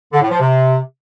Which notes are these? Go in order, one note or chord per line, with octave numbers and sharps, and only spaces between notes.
D3
A2
F3
C3